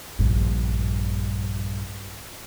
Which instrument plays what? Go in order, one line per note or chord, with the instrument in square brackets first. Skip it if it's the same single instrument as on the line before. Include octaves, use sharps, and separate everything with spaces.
[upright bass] A#1 G2